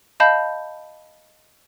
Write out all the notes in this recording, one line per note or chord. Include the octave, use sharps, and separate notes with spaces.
D#5 F5 A5 B5 G6